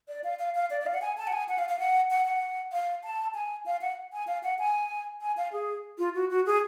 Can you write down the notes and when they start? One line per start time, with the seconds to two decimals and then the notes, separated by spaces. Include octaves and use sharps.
0.08 D5
0.24 F5
0.39 F5
0.55 F5
0.70 D5
0.81 D5
0.86 F5
0.94 F#5
1.02 G#5
1.17 A5
1.27 F#5
1.32 G#5
1.49 F#5
1.58 F5
1.69 F5
1.79 F#5
2.10 F#5
2.26 F#5
2.72 F5
3.04 A5
3.34 G#5
3.66 F5
3.81 F#5
4.13 G#5
4.27 F5
4.43 F#5
4.59 G#5
5.21 G#5
5.37 F5
5.52 G#4
5.98 F4
6.15 F#4
6.30 F#4
6.46 G#4